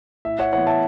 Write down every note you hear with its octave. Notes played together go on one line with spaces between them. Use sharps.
A2 E5
C#5 F#5
E3 B3 C#5 F#5
E5 A5